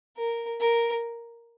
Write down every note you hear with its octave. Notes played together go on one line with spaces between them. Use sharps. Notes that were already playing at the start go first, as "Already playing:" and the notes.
A#4
A#4